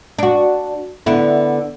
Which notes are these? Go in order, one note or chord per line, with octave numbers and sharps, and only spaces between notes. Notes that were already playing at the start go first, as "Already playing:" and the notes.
D4 F#4
D3 B3 E4